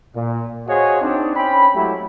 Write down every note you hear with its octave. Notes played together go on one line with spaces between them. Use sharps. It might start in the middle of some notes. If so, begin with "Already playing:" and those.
A#2
F#4 G#4 C5 C#5 D#5 F5
C4 D4 D#4
C4 C#4 G5 B5
F#3 G#3 A3 E4 G4